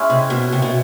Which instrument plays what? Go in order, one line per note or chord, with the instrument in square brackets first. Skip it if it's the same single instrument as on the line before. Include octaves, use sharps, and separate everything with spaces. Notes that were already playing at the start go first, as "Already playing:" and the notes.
Already playing: [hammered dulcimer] G#3 C#4 E4
[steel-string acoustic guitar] C3
B2
C3
B2